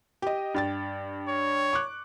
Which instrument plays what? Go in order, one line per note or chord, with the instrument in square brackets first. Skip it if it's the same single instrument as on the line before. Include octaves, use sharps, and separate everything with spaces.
[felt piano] G4 D#5
G2 G5 A6
[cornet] C#5
[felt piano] C#6 D6 F#6